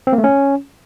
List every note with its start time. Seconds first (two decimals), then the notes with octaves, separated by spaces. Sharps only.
0.07 C4
0.13 A#3
0.18 A3
0.24 C#4